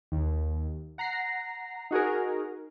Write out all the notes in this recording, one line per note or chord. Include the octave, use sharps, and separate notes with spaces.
D#2
F#5 A#5 A#6 C7
D#4 F#4 G#4 A#4